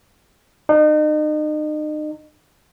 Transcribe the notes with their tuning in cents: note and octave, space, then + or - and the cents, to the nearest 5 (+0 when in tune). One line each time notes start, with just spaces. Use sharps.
D#4 -35